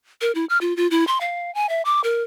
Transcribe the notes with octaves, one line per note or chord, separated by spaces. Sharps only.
A#4
E4
F6
F4
F4
E4
C6
F5
G#5
E5
D6
A#4